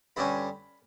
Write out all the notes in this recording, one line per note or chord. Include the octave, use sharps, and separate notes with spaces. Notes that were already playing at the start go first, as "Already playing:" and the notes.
G2 D3 G3 C#4 B5